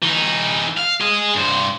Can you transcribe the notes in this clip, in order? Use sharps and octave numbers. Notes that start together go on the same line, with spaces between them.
E3 D#4
F5
G#4 D#5
G2 C5